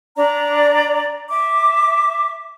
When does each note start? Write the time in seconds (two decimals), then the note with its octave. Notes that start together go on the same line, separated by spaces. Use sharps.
0.16 D4 D5 A#5
1.29 E5 D6